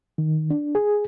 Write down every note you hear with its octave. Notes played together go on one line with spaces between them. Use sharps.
D#3
D4
G#4